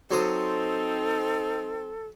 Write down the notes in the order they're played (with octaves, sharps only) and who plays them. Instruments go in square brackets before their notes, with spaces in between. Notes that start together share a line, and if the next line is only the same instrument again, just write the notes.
[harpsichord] F#3 C5 D#6 [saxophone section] C4 D#4 [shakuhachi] A4